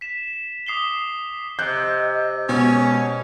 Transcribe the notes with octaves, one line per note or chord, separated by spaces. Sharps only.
B6 E7
D6 D#6 C7 E7 G7
C3 D#5 F#6 G6
B2 G#3 C#4